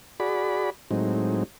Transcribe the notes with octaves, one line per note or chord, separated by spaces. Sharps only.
F#4 G#4 D5 B5
A2 F#3 G#3 C4 D#4